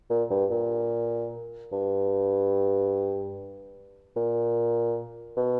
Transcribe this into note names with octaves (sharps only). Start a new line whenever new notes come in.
A#2
G2
A#2
G2
A#2
B2